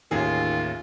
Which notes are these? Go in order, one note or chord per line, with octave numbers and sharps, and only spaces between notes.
A1 D#2 D#3 F4 G#4